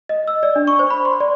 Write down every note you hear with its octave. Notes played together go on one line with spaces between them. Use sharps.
D#5
E6
D5
D4
C#6
C5
B5
C6
D5